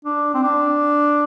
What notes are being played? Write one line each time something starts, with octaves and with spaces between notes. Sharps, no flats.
D4
C4
D4